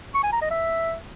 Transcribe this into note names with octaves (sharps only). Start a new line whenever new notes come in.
C#6
G#5
A#5
D#5
E5